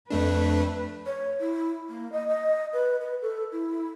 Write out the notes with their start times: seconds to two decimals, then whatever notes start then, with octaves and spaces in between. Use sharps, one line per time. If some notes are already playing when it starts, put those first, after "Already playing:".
0.10 F2 A3 D4 B4
1.06 C#5
1.40 E4
1.90 A#3
2.12 D#5
2.28 D#5
2.73 B4
3.01 B4
3.22 A4
3.52 E4